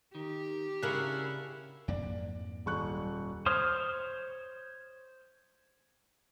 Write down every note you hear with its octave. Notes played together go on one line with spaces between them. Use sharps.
D#3 G4
C#3 D4 E4 F#4 G#4 A#4 F#6
F2 G#2 A#3 D5
D#1 C#6 F#6
C5 C#5 C6 D#6 F6